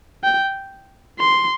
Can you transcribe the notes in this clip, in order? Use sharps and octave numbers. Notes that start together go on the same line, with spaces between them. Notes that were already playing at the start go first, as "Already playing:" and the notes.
G5
C6